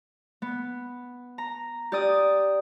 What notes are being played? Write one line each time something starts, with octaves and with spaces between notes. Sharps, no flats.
B3
A#5
G4 D5 D#6